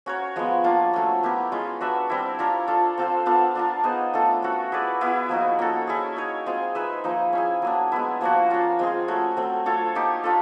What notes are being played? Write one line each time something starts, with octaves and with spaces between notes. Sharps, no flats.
C#4 F#4 A#4 C#5
F3 G#3 B3
A#3 D4 F4
F#3 A3 C#4
B3 E4 G4 A#4
G#3 C#4 F4
D4 F#4 B4 E5
G3 C4 E4
D4 F4 A#4 C#5
D4 F4 A4
C4 F4 A4 C5
B3 D4 F4 A4
D4 F4 A#4
B3 D#4 G#4 C5
A3 D4 F4 A4
C#4 F#4 A4
E4 G#4 B4 D5
B3 E4 G#4
F3 A#3 D#4 F#4
A#3 C#4 F#4 A4
C#4 E4 G#4
D#4 G#4 C#5
G#3 C4 F4 G#4
D#4 G#4 B4 E5
F3 A#3 D#4
C#4 E4 G#4
F#3 A#3 D4
G#3 B3 E4
F3 A#3 D4 F#4
A#3 C#4 F4
G#3 C4 F4 G#4
A3 C#4 F#4 A#4
F#3 A3 C4
D4 F4 A4 C#5
A#3 D#4 G4
D4 F4 A4